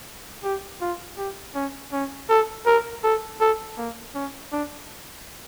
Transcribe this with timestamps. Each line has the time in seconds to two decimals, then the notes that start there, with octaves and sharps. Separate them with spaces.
0.44 G4
0.81 F4
1.18 G4
1.55 C#4
1.92 C#4
2.30 A4
2.66 A#4
3.03 A4
3.40 A4
3.78 A#3
4.15 C#4
4.52 D4